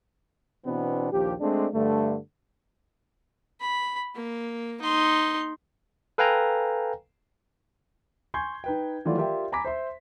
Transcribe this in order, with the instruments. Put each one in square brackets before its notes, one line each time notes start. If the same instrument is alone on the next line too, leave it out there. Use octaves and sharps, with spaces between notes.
[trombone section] B2 E3 B3 C4 D4
A#1 D#2 F3 G4
G#3 A3 C4 D4
G2 D3 A3
[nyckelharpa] B5
A#3
D#4 C6
[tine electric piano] A4 B4 F5 G5 G#5 A#5
[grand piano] G#5 C6 C#6 G6 G#6
D#4 B4 G5
D#3 E3 F#3 A3 F4 D5
F4 G4 A#4 D5 E5 G5
G#5 A#5 B5 D6 B6
C5 E5 C6